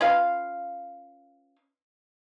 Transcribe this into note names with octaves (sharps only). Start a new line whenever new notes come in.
C#4 F4 B4 F5